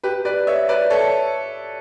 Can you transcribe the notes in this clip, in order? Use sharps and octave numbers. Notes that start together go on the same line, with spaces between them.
G4 B4
B4 D5
C#5 E5
B4 D5
A4 C#5